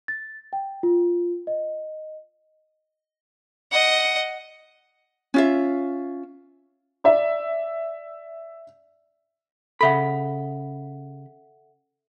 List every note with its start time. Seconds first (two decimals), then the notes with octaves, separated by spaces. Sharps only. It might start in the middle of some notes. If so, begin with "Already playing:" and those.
0.08 A6
0.53 G5
0.83 F4
1.47 D#5
3.72 D#5 F#5
5.34 C#4 F4 E5
7.04 D5 E5
9.81 C#3 A4 E5 F#5 B5